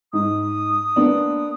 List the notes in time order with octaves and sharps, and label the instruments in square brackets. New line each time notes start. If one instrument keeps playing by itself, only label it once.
[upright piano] G#2 [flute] D#6
[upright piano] A#3 B3 D4